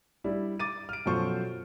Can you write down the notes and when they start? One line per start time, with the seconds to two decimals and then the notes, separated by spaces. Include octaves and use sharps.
0.24 G3 D4 E4
0.59 D6 A6 D#7
0.89 F6 D7
1.06 F#2 B2 F3 A4 C5 C#6